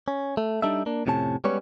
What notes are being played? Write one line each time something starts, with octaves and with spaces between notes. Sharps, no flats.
C#4
A3
G3 D4 D#4 A4 E5
A#3 D4
F2 A2 C3 C#4 A5
G3 G#3 B3 C#4 B4 C#5